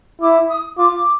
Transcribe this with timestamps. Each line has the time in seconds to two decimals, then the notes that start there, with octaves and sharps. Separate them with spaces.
0.21 E4 D6
0.50 D#6
0.78 F4 D6